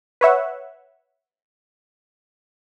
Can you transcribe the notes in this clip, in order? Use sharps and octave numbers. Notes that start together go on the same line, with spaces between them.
B4 C#5 E5 F#5